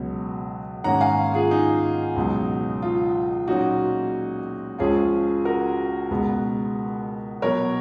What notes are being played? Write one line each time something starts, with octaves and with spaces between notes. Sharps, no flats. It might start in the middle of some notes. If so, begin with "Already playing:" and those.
Already playing: C#2 B2 F#3 B3
G#2 D#3 A#3 C#4 F#5 A#5
F5 G#5
F4 G#4
D#4
C#2 B2 F#3
F4
A#2 F#3 A#3 C#4 D#4 F#4
C#2 C#3 F3 G#3 C#4 F4 G#4
F#4 A#4
C#2 B2 G#3 B3
B2 F#3 B3 A#4 C#5